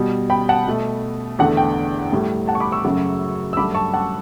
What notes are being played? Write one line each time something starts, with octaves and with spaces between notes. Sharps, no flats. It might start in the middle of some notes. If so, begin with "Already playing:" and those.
Already playing: B2 G3
G5 B5
F#5 A5
B2 A3
E2 D3 A3 F#5
G5
A2 G3
F#5 A5
C#6
B5 D6
C#6 E6
F#2 C#3 F#3 A3
E6
G2 F#3 A3 B5 D6
A5 C#6
F#5 A5